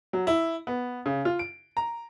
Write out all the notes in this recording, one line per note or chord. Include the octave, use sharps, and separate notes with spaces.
F#3
E4
B3
C#3
F4
D7
A#5